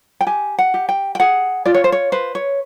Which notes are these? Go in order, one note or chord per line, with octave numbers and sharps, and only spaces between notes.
G5
G4 G#5
F#5
G4
G5
G5
G#4 F#5
F4 D5
C#5
C5
C#5
B4 C5
C#5